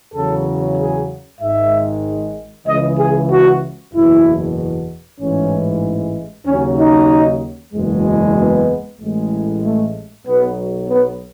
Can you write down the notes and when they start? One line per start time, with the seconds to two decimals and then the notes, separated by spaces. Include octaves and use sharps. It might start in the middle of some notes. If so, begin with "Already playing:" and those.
0.14 E2 C#3 F#3 A4
0.78 G#4
1.40 G#1 G#2 D#3 G#3 E5
2.67 C#2 C#3 E3 D#5
2.99 G#4
3.31 F#4
3.93 F#1 E2 B2 E4
5.20 A1 G#2 E3 G#3 C#4
6.47 D#2 C#3 F#3 C#4
6.79 D#4
7.74 F#1 E2 B2 G#3
8.37 B3
9.00 A1 A2 G#3
9.64 A3
10.27 B1 B2 F#3 B3
10.90 B3